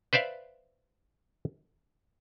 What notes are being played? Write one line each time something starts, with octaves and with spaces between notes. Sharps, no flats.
B4 C5 D5 E5 F5